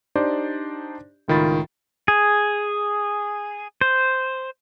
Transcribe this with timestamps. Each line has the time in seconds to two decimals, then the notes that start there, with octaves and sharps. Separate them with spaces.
0.15 D4 D#4 G4 C5 D5
1.28 C#2 A2 D#3 F4 B5 A6
2.08 G#4
3.81 C5